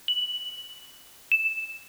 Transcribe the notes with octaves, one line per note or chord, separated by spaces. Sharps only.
F#7
E7